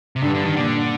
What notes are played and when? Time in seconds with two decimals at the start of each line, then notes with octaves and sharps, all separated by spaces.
0.16 C3
0.23 G2 D3
0.35 D3
0.45 D#3
0.56 A#2 D3